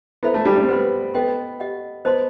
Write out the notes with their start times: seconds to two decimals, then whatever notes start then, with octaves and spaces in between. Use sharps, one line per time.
0.23 B3 E4 A4 C5 E5 B5
0.34 A3
0.45 G3
0.57 G3
0.63 C4
0.69 B3 B4 F#5 C6
1.14 B3 A4 D#5 G5 C6
1.60 G4 D#5 F#5
2.05 B3 C5 D#5 A5 C6